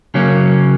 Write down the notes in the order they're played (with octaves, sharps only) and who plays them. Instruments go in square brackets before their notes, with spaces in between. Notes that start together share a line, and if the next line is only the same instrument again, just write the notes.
[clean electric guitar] C#3 F#3 A#3 C#4